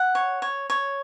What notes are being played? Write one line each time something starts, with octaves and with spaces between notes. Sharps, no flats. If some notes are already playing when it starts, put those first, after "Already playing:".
Already playing: F#5
C#5
C#5
C#5